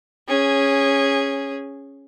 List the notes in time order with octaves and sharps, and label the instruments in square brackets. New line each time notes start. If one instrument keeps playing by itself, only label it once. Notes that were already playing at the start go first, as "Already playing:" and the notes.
[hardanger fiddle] C#4 G#4